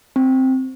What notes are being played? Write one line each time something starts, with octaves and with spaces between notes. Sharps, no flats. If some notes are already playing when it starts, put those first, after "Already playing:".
C4